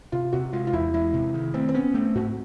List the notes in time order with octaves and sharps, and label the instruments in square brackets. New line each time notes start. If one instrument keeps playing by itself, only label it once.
[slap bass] C3 [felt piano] F4
[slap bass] C3 [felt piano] F#4
[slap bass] G#3 [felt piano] F4
[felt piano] F4
[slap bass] E2 [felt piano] E4
[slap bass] G#3 [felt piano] E4
[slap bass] C3
D#3
[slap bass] A3 [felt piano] C4
[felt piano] C4
[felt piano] B3 [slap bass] C#4
[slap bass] A3 [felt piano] C4
[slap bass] G#2 [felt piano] F#4